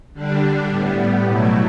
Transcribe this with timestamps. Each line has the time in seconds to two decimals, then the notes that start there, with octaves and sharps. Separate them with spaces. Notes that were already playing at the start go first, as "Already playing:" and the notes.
0.13 D3 G3 D4
0.69 A2 G3 B3
1.26 B2 F#3 A3 E4